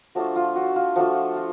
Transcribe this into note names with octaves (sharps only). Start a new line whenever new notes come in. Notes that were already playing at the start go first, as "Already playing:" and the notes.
F3 A3 D4 F4 F#4
F4
F#4
F4
F3 A3 D4 F4 F#4
F4